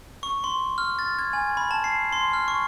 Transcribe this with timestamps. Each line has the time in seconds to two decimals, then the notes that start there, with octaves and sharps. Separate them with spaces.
0.23 C#6
0.44 C6
0.78 F6
0.99 A6
1.19 G#6
1.33 G#5
1.57 B5
1.71 A5
1.84 C7
2.12 C6
2.33 F6
2.48 C#6